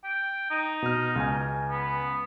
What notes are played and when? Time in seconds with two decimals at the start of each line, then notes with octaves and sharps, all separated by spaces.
0.04 G5
0.51 D#4
0.82 B2 F6
1.16 C#2 G#5
1.70 B3